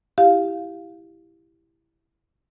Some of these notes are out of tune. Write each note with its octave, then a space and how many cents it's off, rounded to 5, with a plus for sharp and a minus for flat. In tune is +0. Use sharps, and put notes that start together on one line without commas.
E4 +0 G4 +0 F5 +0